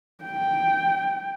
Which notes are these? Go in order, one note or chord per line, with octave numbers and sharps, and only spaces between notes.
G5